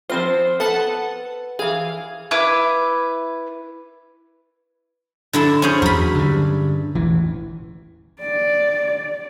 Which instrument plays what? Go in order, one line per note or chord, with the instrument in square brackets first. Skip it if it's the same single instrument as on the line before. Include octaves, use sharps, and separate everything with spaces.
[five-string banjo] F3 C4 F4 [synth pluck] C5
[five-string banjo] B3 [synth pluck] A4 F#5 A5
[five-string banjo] E3 G#4 [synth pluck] F5
[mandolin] E4 B4 D6
[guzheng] D3 E4 A4
C#4 G#4 C5
[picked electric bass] E2 F#3 [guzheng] A#4 B5
[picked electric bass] G2 D3
E1 A1 E3
[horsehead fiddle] D5